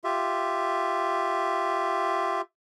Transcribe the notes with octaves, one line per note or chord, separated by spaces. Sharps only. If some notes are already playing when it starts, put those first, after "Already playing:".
F4 G4 E5